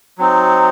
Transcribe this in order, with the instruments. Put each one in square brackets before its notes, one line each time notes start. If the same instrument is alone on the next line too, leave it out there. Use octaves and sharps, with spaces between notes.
[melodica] F#3 C4 D#4